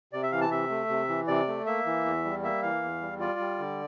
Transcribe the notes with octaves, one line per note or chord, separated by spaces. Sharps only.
C3 D5
E5
E3 F5
A5
C3 E5
A3
C3
E3
C3 D5
A3
A#3 E5
E3
E2
G3
A#3 E5
E3 F5
E2
G3
F4 D5
G3
D3